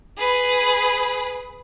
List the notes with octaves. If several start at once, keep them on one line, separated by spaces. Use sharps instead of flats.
G#4 B4